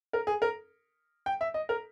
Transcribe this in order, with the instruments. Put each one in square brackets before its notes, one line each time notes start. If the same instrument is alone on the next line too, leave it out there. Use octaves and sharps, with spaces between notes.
[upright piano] A#4
G#4
A#4
G5
E5
D#5
A#4